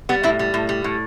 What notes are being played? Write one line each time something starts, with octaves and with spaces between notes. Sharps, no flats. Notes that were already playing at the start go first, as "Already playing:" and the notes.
G3 B3
A2 E4
G3
A2
G3
A2